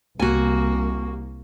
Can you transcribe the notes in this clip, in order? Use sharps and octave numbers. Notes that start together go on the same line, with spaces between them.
C2 A#3 F#4 G#5